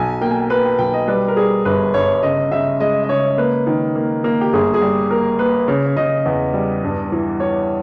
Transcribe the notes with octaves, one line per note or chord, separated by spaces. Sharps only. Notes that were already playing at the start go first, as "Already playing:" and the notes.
Already playing: B1 G#5
A#3 G5
G#5
G5
A#3 B4
G5
B1 G5
D#5
G3 B4
A#4
G3 G#4
G1 B4
G1 C#5
C#3 D#5
C#3 E5
G#3 D#5
D#5
C#3 C#5
A#3 B4
D#3
A#3
A#3
G4
G1 G#4
G#4
G3 G4
A#3 A#4
A#3 B4
C#3 C#5
C#5
C#3 D#5
E2
G3
G2
E3
E3 C#5